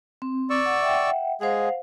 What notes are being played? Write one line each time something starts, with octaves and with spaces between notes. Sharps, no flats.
C4
D5 C#6 E6
F#5
E5 F#5 G5
G#3 G#4 C5 F5 F#5